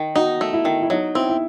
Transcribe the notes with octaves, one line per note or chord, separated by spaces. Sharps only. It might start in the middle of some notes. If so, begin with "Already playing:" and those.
Already playing: D#3
D#4 F#4
A3
E4
D#3
E4
F#3 D#4
C4 E4
E4